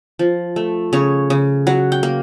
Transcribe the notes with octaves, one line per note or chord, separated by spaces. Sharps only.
F3
A3
C#3 C#5
C#3
F#3 F#5
G5
A#3